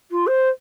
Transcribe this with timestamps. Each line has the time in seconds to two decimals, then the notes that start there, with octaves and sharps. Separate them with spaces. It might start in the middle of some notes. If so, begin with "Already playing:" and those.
0.11 F4
0.27 C5